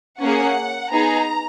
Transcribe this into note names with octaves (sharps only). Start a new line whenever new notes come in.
A#3 C#4 G#4 F#5
B3 D#4 G#4 A#5